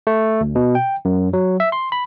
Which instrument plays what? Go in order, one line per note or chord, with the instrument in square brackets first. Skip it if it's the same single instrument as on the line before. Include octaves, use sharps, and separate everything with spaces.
[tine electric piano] A3
D2
B2
G5
F#2
F#3
E5
C6
B5